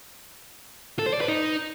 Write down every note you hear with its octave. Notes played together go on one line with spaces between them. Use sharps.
A4
C5
D5
B4
D#4